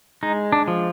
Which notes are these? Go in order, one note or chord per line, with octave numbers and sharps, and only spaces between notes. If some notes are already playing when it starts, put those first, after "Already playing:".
G#3 D#4
D4
F3